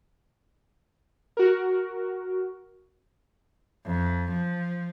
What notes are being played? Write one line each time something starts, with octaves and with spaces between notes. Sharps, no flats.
F#4 A#4
F2
F3